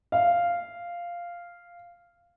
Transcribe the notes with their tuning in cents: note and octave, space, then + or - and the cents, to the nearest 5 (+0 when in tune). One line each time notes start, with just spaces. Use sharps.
F5 -5